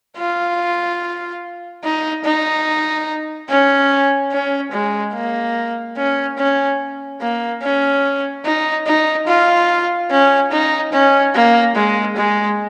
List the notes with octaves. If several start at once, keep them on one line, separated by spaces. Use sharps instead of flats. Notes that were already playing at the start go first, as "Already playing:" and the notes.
F4
D#4
D#4
C#4
C#4
G#3
A#3
C#4
C#4
A#3
C#4
D#4
D#4
F4
C#4
D#4
C#4
A#3
G#3
G#3